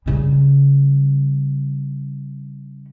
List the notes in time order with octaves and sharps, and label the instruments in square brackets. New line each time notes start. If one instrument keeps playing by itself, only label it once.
[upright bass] C#3 G3